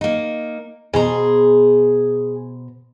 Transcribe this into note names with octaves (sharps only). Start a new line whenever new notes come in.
A#3 D#4
B2 G#4 C5 A#5